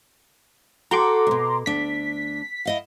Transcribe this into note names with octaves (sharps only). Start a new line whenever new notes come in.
F#4 A4 G5 A#5 C6 D6
D2 B2
D2 D4 B6
E4 D#5 F5